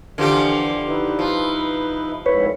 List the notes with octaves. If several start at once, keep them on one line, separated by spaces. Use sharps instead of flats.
D3 E3 F3 G4
D#4 E4 B4
F3
F2 G#2 E4 B4 C#5